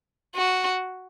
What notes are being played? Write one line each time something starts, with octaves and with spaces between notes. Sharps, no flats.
F#4